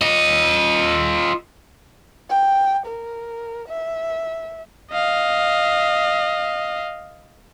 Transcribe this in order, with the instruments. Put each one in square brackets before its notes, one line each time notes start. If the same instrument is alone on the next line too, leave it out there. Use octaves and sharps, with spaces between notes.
[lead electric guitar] F4 D#5
[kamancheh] G5
A#4
E5
[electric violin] D#5 F5